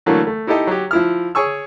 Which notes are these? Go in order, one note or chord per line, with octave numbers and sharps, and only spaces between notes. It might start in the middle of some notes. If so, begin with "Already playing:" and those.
D3 E3 F#3 A3 A#3
A3
D#4 E4 G4 A4 D#5
F#3 G4
F3 E4 F6
G#4 C#5 G#5 C#6 E6